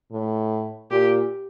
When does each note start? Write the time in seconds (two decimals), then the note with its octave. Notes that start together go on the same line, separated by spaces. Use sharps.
0.12 A2
0.91 A#2 G4